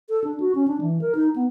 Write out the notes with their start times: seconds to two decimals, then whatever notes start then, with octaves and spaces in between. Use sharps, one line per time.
0.10 A4
0.24 D4
0.40 F#4
0.55 C#4
0.68 D4
0.81 E3
1.01 A#4
1.15 D#4
1.36 B3